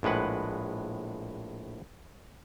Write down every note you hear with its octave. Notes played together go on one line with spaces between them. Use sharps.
A#1 A2 G#3 B4 F#5